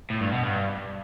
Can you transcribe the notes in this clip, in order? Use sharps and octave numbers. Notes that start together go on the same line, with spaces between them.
A2
G2
B2
G2